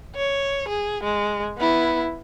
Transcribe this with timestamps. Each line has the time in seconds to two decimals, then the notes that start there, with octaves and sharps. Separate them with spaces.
0.16 C#5
0.69 G#4
1.04 G#3
1.58 B3 E4